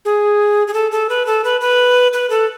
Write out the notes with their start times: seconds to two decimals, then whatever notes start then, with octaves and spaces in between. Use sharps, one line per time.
0.05 G#4
0.68 G#4
0.74 A4
0.92 A4
1.09 B4
1.27 A4
1.44 B4
1.61 B4
2.13 B4
2.30 A4